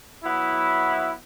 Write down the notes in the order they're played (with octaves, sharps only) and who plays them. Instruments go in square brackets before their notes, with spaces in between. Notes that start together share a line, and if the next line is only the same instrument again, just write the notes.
[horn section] F#3 B3 E4